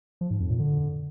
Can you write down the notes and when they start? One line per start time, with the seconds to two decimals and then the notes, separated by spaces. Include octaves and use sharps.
0.21 F3
0.31 G#2
0.40 F2
0.50 A#2
0.59 D3